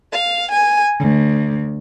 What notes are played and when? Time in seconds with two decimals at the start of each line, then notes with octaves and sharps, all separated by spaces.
0.12 F5
0.51 G#5
0.99 D2